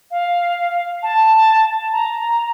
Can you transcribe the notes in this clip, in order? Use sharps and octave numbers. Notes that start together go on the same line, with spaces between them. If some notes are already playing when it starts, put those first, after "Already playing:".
F5
A5
A#5